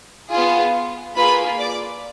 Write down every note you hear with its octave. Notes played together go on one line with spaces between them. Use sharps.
B3 F4 G#4
A#3 F4 G#4 B4 B5
D5 D6